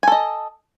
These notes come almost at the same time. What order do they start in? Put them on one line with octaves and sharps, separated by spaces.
G#5 A4 D#5